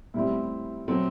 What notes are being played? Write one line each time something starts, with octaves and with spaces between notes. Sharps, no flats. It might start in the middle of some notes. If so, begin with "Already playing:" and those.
A2 G3 C4 E4
F#3 A3 C4